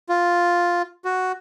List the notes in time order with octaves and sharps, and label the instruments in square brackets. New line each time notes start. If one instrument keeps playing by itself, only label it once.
[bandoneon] F4
F#4